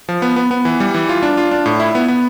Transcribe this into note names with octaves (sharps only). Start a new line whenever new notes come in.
F3
B3
B3
B3
E3
G3
E3
F4
D4
F4
D4
A2
E4
B3
B3